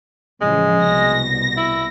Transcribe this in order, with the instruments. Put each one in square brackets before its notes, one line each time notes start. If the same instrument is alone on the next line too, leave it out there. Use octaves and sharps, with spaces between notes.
[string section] A1 C#3 F3 [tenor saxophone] G#3
[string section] C2 B2 A#6
[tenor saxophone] E4